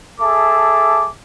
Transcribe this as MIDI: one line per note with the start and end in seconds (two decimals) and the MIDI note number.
0.21 1.08 68
0.21 1.08 69
0.21 1.08 76
0.21 1.08 81
0.21 1.08 86